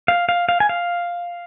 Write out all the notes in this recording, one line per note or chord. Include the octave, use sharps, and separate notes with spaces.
F5
F5
F5
G#5
F5